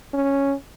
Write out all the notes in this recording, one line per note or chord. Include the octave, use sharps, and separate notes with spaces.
C#4